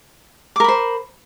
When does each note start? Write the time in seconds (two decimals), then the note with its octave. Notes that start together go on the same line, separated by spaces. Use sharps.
0.56 D6
0.60 A#4
0.64 B5
0.68 C5